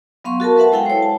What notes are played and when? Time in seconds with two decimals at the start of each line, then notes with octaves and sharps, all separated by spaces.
0.24 F#3 B3 F5 C6 C#6
0.40 F#4 A4 A#4 A5
0.56 A4 B4 E5 F#5 A5
0.72 G#3 E4 A4 F5 G5
0.86 C5 C#5
1.03 A5